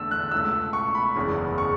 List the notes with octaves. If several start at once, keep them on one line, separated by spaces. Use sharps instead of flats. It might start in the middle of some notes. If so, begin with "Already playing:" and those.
Already playing: E2 D3 A3 E6
F#6
C#2 B2 A3 E6
C#6
B5
F#1 E2 C#3
C#6